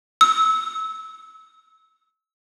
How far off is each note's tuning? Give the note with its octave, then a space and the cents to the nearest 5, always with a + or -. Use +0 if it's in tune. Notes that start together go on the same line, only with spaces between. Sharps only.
E6 -25